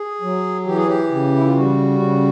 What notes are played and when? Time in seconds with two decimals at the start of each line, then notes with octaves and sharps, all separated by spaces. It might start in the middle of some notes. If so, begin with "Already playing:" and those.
Already playing: G#4
0.22 F#3
0.66 E3 G4
0.77 G#4
0.87 G4
1.11 C#3
1.36 E4
1.46 F4
1.55 G3 F#4
2.00 C#3